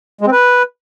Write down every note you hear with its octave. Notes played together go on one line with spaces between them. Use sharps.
G#3
C4
B4